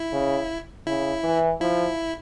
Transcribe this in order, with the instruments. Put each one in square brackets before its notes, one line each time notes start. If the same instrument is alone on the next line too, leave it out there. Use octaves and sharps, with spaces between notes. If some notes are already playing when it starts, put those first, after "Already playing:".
Already playing: [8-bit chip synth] E4
[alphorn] C#3
[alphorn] C#3 [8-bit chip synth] E4
[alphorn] E3
[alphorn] F3 [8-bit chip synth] E4